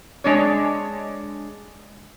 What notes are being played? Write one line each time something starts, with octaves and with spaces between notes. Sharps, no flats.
G#3 D4 C#5